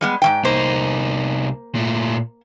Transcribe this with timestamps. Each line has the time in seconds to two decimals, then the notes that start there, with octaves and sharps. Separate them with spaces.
0.01 G3 G#3 B3
0.22 G#2 E3 G5
0.45 C2 A#3 D#4 C5
1.75 A#2 A3